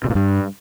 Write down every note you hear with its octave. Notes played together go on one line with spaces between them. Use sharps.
C3
A#2
G2